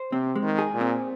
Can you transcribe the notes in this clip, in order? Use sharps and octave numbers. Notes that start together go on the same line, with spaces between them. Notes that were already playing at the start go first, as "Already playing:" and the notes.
Already playing: C5
C3 C4
G#3
D#3
G#4
A#2
C4